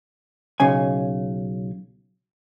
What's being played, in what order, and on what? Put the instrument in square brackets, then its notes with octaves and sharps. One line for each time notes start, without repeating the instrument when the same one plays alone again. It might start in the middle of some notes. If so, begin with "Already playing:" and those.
[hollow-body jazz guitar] B1 C#3 G#5